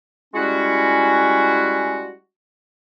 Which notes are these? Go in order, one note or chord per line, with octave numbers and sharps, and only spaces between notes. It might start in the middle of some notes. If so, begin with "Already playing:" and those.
G3 G#3 C#4 E4 F#4